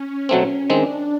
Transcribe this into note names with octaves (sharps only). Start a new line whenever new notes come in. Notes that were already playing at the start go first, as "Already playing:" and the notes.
Already playing: C#4
B2 F#3 A3 C4
D#3 G#3 C4 D4